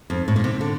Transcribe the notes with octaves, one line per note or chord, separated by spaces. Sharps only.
F2
A2
A#2
C3
D3